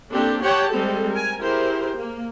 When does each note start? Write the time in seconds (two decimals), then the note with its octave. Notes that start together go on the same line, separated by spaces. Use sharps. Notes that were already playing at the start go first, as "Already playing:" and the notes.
0.13 A#3 C4 D4 G4 A4
0.42 G4 C#5 F#5 G5 A5
0.73 G3 G#3 C4 A4
1.13 A#4 G#5
1.42 E4 G4 G#4 A#4 C5
1.98 A#3